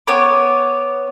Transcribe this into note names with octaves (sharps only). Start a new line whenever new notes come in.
B3 C#5 D6